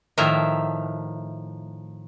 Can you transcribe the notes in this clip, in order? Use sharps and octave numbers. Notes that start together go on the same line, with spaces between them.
A2 D#3 F3 A#4 E5